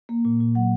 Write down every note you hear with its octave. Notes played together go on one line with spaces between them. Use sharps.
A#3
A#2
A#2
F#3 F#5